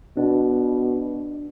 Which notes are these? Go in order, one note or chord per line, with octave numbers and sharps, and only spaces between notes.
B2 D4